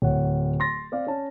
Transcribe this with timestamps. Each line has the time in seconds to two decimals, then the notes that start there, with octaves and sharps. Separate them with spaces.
0.02 D1 C#5 F#5
0.60 C6 A6 A#6
0.92 C4 D5 F5
1.07 C#4 A5